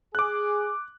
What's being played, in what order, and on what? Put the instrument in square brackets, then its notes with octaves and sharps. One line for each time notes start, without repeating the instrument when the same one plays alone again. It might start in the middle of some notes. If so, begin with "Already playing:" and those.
[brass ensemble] G#4 [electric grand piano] D6 F#6